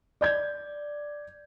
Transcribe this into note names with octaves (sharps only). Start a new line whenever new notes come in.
D5 G6 G#6